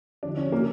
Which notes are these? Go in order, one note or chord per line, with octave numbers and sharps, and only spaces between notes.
E2 D3 F3 D4
C#4
C#3 A#3